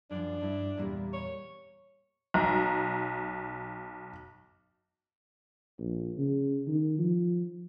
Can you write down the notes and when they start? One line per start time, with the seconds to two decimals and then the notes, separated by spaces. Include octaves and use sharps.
0.11 F#2 F3 D4
0.41 G2 E4
0.77 E2 A#2 G3 A#3
1.13 C#5
2.34 B1 A#5
5.79 A#1
6.18 C#3
6.68 D#3
6.99 F3